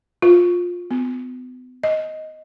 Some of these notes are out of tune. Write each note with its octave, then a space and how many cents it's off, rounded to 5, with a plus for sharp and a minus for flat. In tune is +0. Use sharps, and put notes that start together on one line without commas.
F4 +15
B3 +35
D#5 +5